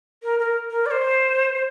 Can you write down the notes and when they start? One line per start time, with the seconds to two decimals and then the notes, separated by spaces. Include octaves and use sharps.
0.23 A#4
0.39 A#4
0.70 A#4
0.86 D5
0.91 C5
1.55 C5